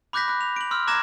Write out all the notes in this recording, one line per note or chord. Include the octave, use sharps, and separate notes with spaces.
B5 D6 F#6 G6 A#6 B6
B5 F#6
F7
D7 F#7
C6 E6 F6
A#5 D6 F#6 G#6 A#6 E7